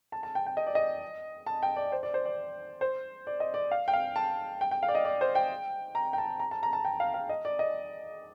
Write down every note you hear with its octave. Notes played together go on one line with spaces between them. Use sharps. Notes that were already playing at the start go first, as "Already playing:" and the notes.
A5
A5
G5
G5
D#5
D5
D#5
A5
G5
D5
C5
D5
C5
D5
C5
D5
D#5
D5
F5
G5
F5
A5
G5
G5
F5
D5
D#5
D5
C5
G5
A#5
G5
A5
A#5
A5
A#5
A5
G5
F5
F5
D#5
D5
D#5